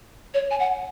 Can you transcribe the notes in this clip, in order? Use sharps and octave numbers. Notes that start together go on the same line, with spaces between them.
C#5
G#5
F#5